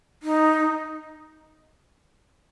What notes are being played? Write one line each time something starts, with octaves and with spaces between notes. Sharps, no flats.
D#4